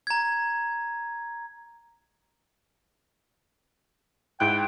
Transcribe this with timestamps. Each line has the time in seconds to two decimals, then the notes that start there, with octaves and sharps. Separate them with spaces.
0.07 A#5 G#6
4.40 G#2 E4 G5 F#6